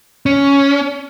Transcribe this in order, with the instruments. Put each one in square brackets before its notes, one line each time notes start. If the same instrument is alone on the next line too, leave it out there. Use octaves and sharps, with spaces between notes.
[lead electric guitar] C#4